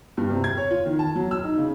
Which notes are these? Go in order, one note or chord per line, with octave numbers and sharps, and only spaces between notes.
G2
C3
G#6
C#5
F4
D#3
A5
F#3
E6
D#4
C#3